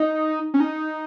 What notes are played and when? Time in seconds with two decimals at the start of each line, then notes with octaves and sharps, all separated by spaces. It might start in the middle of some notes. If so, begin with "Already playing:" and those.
Already playing: D#4
0.54 C#4
0.60 D#4